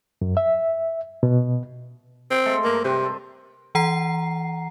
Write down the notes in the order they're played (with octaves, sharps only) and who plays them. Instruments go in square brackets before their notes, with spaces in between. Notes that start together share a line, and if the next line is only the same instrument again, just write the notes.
[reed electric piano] F#2
E5
B2
[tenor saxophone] C4
[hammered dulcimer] G#3 A3 A4
[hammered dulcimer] G2 A#4 [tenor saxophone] A#3
[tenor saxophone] C3 [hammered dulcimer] C4 B4 C5
[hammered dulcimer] A4
[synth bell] E3 F#5 A#5 C7